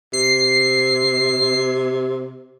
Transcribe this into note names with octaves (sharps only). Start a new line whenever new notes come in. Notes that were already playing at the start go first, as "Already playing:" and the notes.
C3 C7